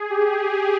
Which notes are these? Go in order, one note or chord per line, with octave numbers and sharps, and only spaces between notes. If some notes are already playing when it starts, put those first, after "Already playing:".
Already playing: G#4
G4